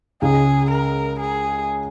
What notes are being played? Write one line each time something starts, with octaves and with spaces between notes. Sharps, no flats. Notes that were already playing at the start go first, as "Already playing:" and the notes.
C#2 C#3 G#3 G#4
A#4
G#4